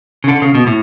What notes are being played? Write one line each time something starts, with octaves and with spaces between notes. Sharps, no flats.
C#3
D3
C#3
B2
A2